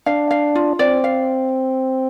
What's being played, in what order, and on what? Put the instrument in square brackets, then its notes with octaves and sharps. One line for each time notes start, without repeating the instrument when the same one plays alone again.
[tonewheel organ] D4 [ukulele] F5
[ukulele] F5
F4
[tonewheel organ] C4 [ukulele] D5
[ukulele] F5